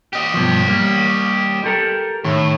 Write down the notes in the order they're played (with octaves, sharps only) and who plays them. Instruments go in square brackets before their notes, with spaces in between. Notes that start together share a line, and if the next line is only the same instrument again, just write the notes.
[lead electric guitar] G4 D#5
[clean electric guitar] G2 B2 F3
G3 A#3
G4 A4 A#4
[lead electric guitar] A2 [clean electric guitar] D#3